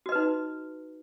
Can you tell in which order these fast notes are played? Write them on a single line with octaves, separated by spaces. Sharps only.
F#4 D#5 B4 D#4